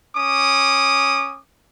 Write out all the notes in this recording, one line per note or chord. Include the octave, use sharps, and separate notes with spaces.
C#4 D6 D#6